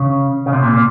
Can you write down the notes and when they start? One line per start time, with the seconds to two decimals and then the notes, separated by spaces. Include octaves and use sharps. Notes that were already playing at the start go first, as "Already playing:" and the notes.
Already playing: C#3
0.46 C#3
0.53 C3
0.63 A#2
0.73 A#2